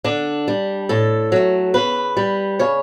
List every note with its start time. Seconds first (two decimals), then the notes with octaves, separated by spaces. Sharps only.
0.04 D3 D4
0.48 G3
0.89 A2 A4
1.32 F#3 A3
1.74 C#3 B4
2.17 G3
2.59 C#3 C#5